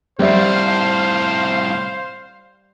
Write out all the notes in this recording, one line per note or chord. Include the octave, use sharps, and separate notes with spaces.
C2 A2 G3 C5 E5 F5